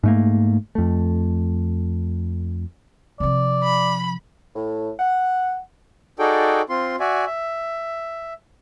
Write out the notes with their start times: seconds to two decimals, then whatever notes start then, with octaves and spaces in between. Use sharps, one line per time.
0.03 G#2 A3 A#3
0.75 F2 A3
3.20 C3 F3 D5
3.64 B5
4.55 A2
4.99 F#5
6.19 D#4 F#4 G#4 A4 D5 G5
6.69 C4 F4 C6
7.00 F#4 D5 E5 G#5
7.26 E5